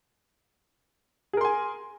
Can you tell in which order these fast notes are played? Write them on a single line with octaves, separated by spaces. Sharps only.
G#4 A#4 C6 G#5